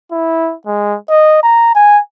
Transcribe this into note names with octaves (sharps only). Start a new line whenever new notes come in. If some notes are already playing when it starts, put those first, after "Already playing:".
E4
G#3
D#5
A#5
G#5